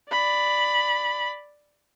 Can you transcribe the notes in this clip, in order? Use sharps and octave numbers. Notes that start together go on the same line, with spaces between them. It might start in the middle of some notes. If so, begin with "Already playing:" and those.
D5 B5